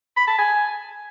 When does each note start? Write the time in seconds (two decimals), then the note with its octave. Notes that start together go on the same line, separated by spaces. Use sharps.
0.17 B5
0.27 A5
0.38 G#5